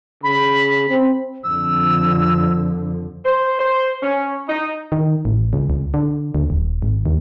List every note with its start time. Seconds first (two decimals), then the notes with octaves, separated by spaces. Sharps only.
0.23 C#3 B5
0.89 C4
1.44 F2 D3 F3 E6
3.25 C5
3.60 C5
4.02 C#4
4.49 D#4
4.92 D#3
5.25 A1
5.53 C#2
5.70 C#2
5.94 D3
6.35 D2
6.50 D#1
6.82 G#1
7.06 D#2